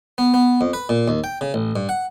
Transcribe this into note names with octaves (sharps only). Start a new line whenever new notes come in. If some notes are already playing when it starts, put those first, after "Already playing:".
B3
B3
F2
B4
A#2
D#2
G5
C#3
A1
G2
F#5